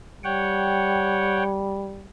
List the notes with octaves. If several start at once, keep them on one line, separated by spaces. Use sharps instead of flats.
G3 C#5 F#5 G5